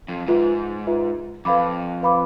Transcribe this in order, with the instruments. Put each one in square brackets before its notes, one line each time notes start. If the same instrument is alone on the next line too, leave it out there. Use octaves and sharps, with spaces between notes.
[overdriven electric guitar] F2
[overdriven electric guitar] G#2 [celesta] F4 B4 E5
[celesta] F4 B4 E5
[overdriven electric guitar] F2 [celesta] B4 F5 B5 D6
[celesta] B4 F5 B5 D6